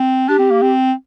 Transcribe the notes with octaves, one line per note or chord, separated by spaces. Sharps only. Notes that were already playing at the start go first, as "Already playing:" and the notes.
Already playing: C4
D4 G4
C4
A#3
C4